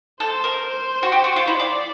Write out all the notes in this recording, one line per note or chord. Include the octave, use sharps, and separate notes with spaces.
A4 C5
A#4
C5
F#4
G4
F#4
F4
E4
F4 D5